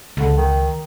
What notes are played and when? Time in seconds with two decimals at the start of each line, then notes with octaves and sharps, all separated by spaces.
0.17 C#2 D3
0.37 D#3